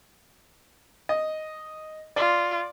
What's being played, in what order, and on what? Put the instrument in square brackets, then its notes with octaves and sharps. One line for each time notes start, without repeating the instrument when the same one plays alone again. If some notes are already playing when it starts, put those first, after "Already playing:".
[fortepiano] D#5
[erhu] F4 [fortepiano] D5